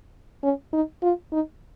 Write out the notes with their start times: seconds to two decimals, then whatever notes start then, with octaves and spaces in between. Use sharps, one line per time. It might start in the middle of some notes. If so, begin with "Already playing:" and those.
0.43 C#4
0.73 D#4
1.03 F4
1.32 D#4